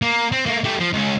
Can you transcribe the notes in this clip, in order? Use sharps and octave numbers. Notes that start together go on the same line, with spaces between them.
A#3
C4
A3 A#3
A3 G4
F3
C#2 C#4